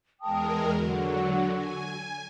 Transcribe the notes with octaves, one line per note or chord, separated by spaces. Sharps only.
E2 G#3 A#4 G5 A5 D#6
D3 F#3 F#4
G#5